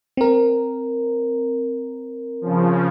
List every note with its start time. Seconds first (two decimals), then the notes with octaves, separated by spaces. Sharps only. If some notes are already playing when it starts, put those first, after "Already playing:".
0.17 C4 A#4
2.41 C#3 F3